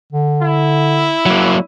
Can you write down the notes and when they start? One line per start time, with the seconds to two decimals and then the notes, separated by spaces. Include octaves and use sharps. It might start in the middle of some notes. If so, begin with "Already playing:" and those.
0.13 D3
0.43 E4
1.26 F#3 A#3